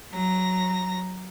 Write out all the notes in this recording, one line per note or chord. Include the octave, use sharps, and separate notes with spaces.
F#3 A#5 A#6